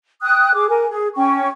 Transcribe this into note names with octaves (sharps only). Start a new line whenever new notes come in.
G5 D#6 F#6
G#4 D6
A#4 G#5
G#4
C#4 G5 C#6